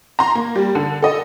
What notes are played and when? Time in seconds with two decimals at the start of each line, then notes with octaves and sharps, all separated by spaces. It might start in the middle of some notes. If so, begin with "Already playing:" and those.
0.19 A#5 C6
0.35 A#3
0.55 G3
0.75 D3
1.02 A4 D#5